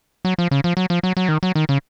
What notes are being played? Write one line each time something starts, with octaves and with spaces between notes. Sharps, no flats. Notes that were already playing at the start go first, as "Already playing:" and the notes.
F#3
F3
C#3
F3
F#3
F3
F#3
F#3
D#3
F#3
D#3
C#3